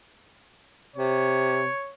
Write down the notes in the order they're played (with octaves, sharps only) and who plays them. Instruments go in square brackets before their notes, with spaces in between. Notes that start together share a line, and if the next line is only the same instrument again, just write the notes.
[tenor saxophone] C3 [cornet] C#5